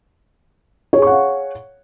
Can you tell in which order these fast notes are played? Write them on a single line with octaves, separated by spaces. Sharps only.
C#5 G#4 C#6 F#5 F5